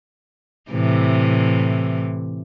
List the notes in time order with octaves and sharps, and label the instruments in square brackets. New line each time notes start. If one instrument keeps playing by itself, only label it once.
[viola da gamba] A2 C3 E3